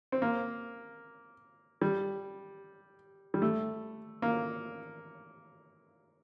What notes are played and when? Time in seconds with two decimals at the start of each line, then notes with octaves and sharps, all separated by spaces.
0.12 C4
0.22 A#3
1.81 G3
3.34 G3
3.42 A3
4.22 A#3